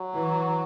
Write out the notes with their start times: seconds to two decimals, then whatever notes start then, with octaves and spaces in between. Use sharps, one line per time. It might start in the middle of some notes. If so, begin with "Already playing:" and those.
Already playing: F#3
0.14 E3